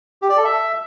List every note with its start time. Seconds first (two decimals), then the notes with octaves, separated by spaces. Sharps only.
0.22 G4
0.30 D5
0.37 A4
0.45 E5